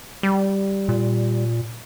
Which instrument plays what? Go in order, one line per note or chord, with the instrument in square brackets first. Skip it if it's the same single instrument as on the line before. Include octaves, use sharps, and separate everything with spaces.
[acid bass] G3
[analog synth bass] A#2